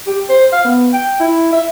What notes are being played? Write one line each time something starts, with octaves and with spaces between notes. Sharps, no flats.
G4
C5
F5
B3
G5
E4
E5